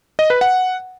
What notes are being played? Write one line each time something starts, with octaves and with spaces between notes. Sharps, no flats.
D#5
B4
F#5